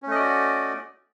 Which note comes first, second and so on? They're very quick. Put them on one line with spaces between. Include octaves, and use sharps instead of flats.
C#4 A3 D#5 D5 F#4